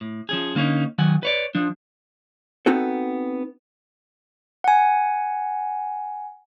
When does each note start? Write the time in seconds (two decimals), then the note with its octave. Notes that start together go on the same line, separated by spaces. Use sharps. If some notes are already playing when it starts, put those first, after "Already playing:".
0.01 A2
0.29 F3 C#4 G#4
0.55 D3 A#3 C4 C#4 D#4
0.98 D#3 F#3 F#5 G#5
1.23 B4 C#5 D5
1.55 F3 D4
2.66 B3 C4 D#4 F#4 A4
4.64 F#5 G#5